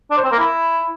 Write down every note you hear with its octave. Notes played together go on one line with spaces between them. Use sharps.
D4
C5
C4
A#3
E4